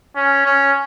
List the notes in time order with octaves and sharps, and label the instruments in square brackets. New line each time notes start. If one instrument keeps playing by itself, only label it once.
[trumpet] C#4
C#4